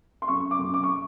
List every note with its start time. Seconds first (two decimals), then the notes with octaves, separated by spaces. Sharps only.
0.22 C6
0.28 F#2 C#6
0.51 D6
0.58 F#2
0.74 D6
0.83 C#6